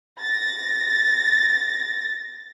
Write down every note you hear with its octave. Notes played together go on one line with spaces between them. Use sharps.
A6 A#6